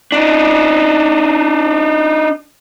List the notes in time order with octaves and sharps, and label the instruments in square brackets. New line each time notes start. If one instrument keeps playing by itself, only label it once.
[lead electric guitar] D4 D#4